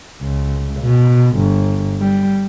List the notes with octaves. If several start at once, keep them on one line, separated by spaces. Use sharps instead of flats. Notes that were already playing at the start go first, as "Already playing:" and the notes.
C#2
B2
G1
G3